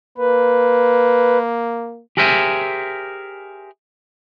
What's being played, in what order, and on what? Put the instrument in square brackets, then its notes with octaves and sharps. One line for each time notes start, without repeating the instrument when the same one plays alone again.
[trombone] A#3 [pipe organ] B4
[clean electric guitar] G4 G#4 A#4 C5 E5 G#5